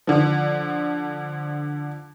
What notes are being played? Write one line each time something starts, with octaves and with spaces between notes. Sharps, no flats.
D3 F3